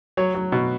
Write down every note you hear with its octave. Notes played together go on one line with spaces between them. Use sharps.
F#3 C#5
F#3
B2